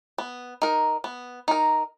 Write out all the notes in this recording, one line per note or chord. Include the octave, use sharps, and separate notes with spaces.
B3
D#4 A#4
B3
D#4 A#4